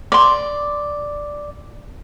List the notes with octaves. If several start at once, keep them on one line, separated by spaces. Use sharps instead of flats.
D5 C6